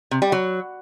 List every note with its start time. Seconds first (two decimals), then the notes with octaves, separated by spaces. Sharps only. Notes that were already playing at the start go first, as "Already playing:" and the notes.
0.11 C3
0.22 G3
0.32 F#3